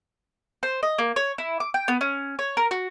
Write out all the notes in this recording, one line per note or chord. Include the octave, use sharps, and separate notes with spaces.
C5
D#5
A#3
C#5
E4
D6
G5
B3
C#4
C#5
A#4
F#4